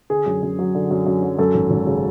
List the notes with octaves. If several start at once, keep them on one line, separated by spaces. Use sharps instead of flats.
D3 G#4
F#2
F#2
F#3
D3
F#2
F#2
F#3
F#2 A4
G#1
G#1
C#3